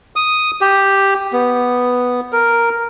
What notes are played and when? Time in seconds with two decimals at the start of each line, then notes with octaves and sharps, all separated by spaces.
0.16 D#6
0.61 G4
1.33 B3
2.32 A#4